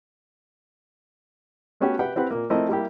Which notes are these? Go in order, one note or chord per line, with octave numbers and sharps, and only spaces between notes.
A3 B3 C#4 F#4 G4
G4 B4 F#5 G5
C4 E4 G4 B4 F#5
A#2 A#3
F3 A3 C4 E4 A#4 D#5
G3 A#3 E4 G4